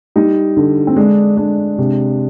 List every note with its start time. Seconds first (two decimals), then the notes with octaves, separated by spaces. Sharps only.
0.16 G3 D#4
0.57 D3
0.87 C4
0.96 G#3 D4
1.37 G#3 D4
1.78 C3